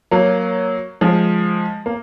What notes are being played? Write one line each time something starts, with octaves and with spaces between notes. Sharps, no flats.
F#3 A#3
F3 G#3
A#3